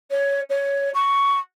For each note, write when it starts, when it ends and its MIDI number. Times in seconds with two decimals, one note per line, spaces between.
0.10 0.41 73
0.49 0.90 73
0.94 1.39 85